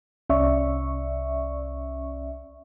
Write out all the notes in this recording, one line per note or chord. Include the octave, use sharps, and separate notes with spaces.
C2 C#4 D5 E5 C#6